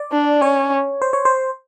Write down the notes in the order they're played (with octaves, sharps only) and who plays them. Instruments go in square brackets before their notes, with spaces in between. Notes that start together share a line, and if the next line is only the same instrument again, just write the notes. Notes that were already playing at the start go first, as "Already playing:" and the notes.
Already playing: [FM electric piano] D5
[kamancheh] D4
[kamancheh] C#4 [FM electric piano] C#5
[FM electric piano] C5
C#5
C5